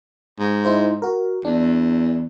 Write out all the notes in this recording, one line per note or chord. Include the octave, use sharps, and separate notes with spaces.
G#2
D#4 E4 C5
F#4 A#4
E2 D4